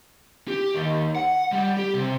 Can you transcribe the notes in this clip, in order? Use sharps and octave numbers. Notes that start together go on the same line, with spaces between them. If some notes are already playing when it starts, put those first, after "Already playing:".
G4
D#2
F#5
G3
G4
C3